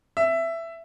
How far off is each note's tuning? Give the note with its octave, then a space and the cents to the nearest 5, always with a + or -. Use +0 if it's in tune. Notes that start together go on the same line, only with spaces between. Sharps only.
E5 +10